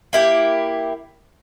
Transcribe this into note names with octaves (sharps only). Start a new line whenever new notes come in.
A#3 E4 G4